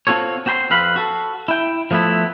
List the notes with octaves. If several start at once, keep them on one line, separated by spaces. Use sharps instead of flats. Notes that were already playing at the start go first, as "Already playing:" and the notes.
C4 F4 F#4 A4 C#5
C4 F#4 G5 B5 C6
F2 C4 B4 F5 B5
F#4 A4
E4 G5
F3 A3 B3 C4 E4